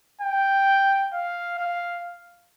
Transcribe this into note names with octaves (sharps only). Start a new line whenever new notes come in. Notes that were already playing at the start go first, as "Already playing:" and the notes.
G5
F5
F5